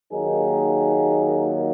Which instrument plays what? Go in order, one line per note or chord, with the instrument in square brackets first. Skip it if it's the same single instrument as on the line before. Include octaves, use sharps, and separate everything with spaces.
[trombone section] D#2 D#3 F#3 A#3 D#4 G#4